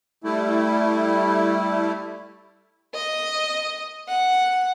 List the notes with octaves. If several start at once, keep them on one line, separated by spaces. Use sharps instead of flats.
G3 A3 E4
D#5
F#5